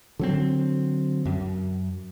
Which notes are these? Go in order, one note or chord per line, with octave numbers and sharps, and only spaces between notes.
D3 F#3 C4
F#2